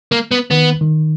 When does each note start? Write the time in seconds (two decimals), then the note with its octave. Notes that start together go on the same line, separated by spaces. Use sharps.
0.12 A#3
0.31 B3
0.51 D#3 B3
0.81 D#3